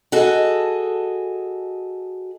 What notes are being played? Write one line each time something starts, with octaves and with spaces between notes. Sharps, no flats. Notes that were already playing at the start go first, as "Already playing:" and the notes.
F#4 G#4 A4 D#5